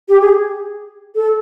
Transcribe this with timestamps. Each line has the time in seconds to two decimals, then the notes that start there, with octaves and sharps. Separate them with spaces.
0.09 G4
0.21 G#4
1.15 A4